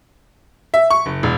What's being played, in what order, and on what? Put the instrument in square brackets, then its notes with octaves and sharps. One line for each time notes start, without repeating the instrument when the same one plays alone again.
[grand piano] E5
C#6
F#1
E1